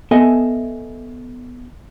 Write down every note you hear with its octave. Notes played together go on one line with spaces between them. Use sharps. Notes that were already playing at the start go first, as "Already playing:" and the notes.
B3 A4 D#5 E5 G#5